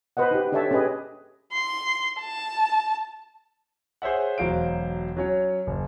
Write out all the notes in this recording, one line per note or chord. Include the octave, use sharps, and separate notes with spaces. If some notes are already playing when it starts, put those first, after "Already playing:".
B4 C5 D#5 F#5
D#4 G4
D4 G4 A4 C#5 E5 A5
C#4 G4 G#4 B4 D#5
C6
A5
G#4 C5 C#5 E5 F#5
E1 F#3 C5 F5 D7
F#3 C#4 C#5
F#1